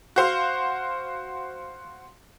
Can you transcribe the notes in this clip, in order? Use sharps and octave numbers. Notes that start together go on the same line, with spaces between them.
F#4 C5 F5